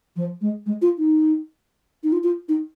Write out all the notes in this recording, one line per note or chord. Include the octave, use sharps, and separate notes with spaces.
F3
G#3
G#3
F4
D#4
D#4
F4
F4
D#4